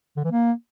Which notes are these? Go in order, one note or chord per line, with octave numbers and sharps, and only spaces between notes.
D3
E3
A#3